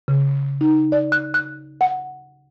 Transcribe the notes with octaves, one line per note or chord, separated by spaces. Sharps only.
C#3
D#4
D5
F#6
F#6
F#5